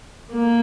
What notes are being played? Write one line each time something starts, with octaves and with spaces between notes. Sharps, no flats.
A#3